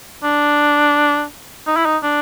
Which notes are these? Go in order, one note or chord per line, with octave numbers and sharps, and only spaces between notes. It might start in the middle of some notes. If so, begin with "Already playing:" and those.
D4
D#4
E4
D#4
D4